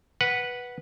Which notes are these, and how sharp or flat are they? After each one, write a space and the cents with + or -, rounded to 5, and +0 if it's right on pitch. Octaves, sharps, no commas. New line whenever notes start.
B4 -10 F#5 +0